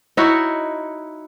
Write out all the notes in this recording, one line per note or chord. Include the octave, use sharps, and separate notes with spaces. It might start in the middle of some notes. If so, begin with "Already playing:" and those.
D#4 E4 F#4 C#5